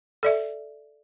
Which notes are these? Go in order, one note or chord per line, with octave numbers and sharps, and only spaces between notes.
A4 D5 E5